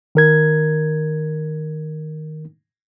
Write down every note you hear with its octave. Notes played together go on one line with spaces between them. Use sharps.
D#3 A#4 G#6